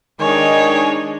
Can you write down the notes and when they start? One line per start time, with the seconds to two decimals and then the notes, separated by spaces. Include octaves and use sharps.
0.21 D#3 G#3 D4 D#4 C#5 G#5